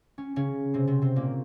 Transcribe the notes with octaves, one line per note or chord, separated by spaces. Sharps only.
C#4
C#3 C#4
C3 C4
C3 C4
C3 C4
A#2 A#3